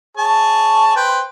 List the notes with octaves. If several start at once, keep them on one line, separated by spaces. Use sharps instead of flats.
G#4 C#5 A5
B4 C5 G5